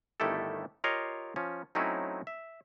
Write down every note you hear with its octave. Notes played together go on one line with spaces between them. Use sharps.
G1 D#3 A3 E4 G4 A4
F4 G4 A#4 C#5 D#5 F5
F3 C#4
F#3 A3 C4 C#4 D#4 E4
E5